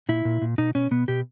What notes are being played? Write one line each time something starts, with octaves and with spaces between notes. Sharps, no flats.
A#2 E4
A#2
A#2
B2 D#4
B2 C#4
B2 B3
B2 G4